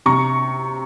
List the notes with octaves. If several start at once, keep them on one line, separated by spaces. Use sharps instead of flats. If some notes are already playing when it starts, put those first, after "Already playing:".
C3 A#5 C#6